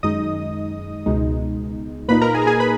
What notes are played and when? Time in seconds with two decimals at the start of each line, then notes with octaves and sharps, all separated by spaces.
0.03 F#2 D#3 G#3 D#4 D#5 D#6
1.06 C#2 B2 G#3 D#4
2.08 A#2 A#3 D#4 B4 B5
2.21 A#4 A#5
2.34 G#4 G#5
2.42 A#5
2.47 G#4 G#5
2.60 B4 B5